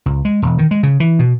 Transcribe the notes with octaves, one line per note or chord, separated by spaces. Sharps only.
C#2
G#3
E1
D#3
G#3
C#3
E3
B2